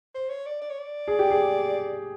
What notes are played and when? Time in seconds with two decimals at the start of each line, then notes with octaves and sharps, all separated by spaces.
0.14 C5
0.29 C#5
0.46 D5
0.61 D5
0.70 C#5
0.79 D5
1.08 G#4
1.19 G4
1.31 G#4